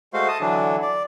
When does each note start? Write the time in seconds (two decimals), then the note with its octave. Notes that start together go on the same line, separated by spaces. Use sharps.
0.13 G#3 A3 F#4 C5 F5
0.28 D#5 A5 D#6
0.41 D3 E3 F#3 D4
0.82 D5